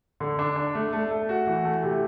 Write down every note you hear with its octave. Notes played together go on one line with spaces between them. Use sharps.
D3
D4
D4
A3
A3
A3
F#4
E3
A3
C3